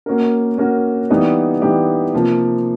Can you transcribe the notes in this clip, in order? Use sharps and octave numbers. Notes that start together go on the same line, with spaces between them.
A#3 C#4 F#4 A#4
A#3 C#4 F#4 A#4
E3 G3 B3 D#4 G4
E3 G3 B3 D#4 G4
C3 F3 A#3